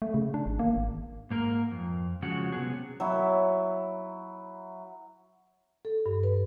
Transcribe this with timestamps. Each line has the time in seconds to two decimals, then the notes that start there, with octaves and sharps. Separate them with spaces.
0.02 A3
0.14 C#3
0.34 D4
0.46 G#1
0.59 A#3
0.76 G#1
1.30 G#2 A#3 A#4
1.71 F2
2.22 C#3 F3 G#3 F#4
2.52 C3 F#3 B3 G#4
3.00 F#3 E4
5.85 A4
6.06 G2
6.23 B4